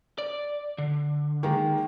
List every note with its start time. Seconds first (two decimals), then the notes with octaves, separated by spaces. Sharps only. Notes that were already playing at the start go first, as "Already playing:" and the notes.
0.18 D5
0.78 D3
1.43 D#3 G#3 A#3